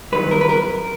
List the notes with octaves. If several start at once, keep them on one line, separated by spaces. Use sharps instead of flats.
G2 D#3 F#3 B4
A#4
B4
A#4